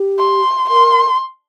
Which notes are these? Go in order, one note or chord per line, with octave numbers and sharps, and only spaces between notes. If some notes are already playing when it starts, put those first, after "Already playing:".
Already playing: G4
C6
A#4 C6